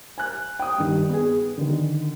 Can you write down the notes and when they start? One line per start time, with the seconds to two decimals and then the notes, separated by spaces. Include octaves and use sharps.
0.18 G#5 F#6
0.59 G5 D#6
0.78 G2 D#3
1.09 B3 G#4
1.58 D3 D#3